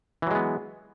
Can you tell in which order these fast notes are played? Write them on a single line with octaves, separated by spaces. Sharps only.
E3 F#3 G#3 B3